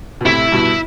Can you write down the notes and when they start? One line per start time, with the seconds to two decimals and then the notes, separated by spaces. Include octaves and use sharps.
0.21 B2
0.25 A2 C3 E4
0.52 G2 B2